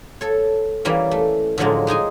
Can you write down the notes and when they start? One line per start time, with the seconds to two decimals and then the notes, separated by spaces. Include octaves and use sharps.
0.21 A4 C#5
0.85 E3 G3 A#3 C#4
1.11 A3
1.58 A2 D3 F3 F#3 G#3 A#3
1.87 G#3 D#4 G#4 G#5